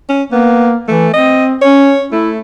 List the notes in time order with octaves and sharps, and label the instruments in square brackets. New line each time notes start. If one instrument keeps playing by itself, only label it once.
[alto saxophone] C#4
[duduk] A#3 [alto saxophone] B3
[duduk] E3 [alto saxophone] A3
[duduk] C4 [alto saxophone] D#5
[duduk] C#4 [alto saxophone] C#5
[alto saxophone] A3 [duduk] E4